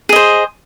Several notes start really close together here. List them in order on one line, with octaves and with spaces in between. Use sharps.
G#4 D#5 C5